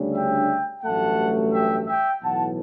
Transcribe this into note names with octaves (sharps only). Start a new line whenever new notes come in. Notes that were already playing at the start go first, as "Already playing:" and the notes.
Already playing: D2 C#3 G3 D4
E5 G5
A1 G2 F#3 A3 F#5 A5
E5 G5
E5 G5
B1 A2 E3 F#5 A5